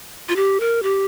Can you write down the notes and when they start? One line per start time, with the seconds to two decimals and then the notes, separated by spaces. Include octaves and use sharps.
0.29 F4
0.36 G4
0.60 A#4
0.83 G4